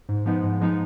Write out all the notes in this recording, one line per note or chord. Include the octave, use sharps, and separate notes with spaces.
G#2
F3 G#3 B3 D#4
G#2
F3 G#3 B3 D#4